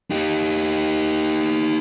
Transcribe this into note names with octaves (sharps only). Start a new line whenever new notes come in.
D#4 G4